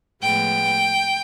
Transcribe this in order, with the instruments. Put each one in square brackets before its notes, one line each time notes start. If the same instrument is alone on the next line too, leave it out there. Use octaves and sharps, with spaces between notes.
[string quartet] A2 F3 G#3 B3 G5